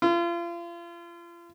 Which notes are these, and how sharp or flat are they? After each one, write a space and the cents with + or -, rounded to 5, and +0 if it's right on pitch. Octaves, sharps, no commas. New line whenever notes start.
F4 -35